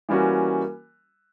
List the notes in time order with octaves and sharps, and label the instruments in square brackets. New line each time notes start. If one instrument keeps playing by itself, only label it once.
[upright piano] E3 G3 A#3 C#4 F#4